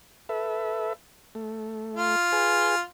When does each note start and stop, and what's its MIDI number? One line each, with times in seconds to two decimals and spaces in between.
0.29 0.93 69
0.29 0.93 71
0.29 0.93 76
1.35 2.16 57
1.96 2.82 65
2.32 2.75 68
2.32 2.75 71
2.32 2.75 80